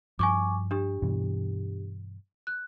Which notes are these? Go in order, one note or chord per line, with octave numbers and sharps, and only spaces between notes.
G2 F3 G#5 C#6 D6
D4 G4
G2 B2 E3
F#6